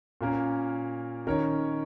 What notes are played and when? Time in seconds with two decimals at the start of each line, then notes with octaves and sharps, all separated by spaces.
0.21 A#2 A#3 C#4 A#4
1.27 D#3 C#4 A#4 C#5